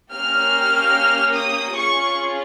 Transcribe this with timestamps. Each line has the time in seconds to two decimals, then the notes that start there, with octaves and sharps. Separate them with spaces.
0.12 A#3 C#4 G4 F6
1.34 D#6
1.75 C#4 F4 G#4 C#6